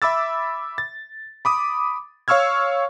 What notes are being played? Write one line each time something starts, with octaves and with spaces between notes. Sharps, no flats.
E5 B5 D6 E6 A6
A6
B5 D6 D#6
C#5 F5 C#6 E6 F6 G#6